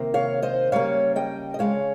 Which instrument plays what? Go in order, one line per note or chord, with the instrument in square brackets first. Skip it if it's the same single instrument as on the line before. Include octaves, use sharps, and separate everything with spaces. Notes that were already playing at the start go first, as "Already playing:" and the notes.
Already playing: [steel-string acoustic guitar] C3 D#3 A#3
C#5 F5
C5 D#5
C#3 G3 A#3 C#5 F5
D#5 G5
D#5
C#3 F3 G#3 C#5 F5